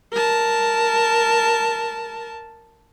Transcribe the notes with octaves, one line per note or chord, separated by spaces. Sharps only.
A#4 A5